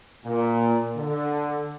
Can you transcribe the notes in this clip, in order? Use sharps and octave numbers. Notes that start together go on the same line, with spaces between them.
A#2
D3